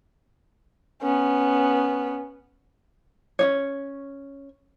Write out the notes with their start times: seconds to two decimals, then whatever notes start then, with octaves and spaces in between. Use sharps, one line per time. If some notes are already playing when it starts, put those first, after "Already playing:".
1.02 B3 C#4
3.39 C#4 D#4 C#5